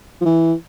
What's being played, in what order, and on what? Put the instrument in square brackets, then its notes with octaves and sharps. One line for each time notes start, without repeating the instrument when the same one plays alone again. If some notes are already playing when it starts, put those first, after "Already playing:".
[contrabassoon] F3
E3